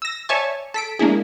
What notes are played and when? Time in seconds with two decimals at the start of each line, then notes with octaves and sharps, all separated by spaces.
0.02 E6 A#6
0.29 C#5 D5 E5 G#5 A5 C#6
0.74 A4 B6 D7
0.99 G#3 A#3 D4 E4 G#4